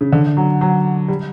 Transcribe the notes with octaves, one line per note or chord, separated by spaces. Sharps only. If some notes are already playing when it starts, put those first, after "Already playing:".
C#3
D3
F#3
F#3
G3